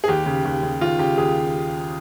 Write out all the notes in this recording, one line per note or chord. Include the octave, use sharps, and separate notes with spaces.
G#4
D#2 G4
C#3
D#2
C#3
D#2 F4
C#3 G4
D#2 G#4